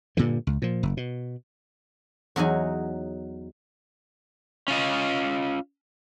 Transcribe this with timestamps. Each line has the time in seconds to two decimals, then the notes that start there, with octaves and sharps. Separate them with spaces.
0.17 G2 A#2 D3 E3
0.47 C#2
0.62 A#2 F3
0.83 F#1
0.97 B2
2.36 E2 F#3 D#4 G#5
4.68 C#4 F4 D#5